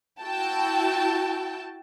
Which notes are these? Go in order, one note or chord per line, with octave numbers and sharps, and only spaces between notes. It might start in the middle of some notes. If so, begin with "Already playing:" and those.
E4 F#4 G5 A5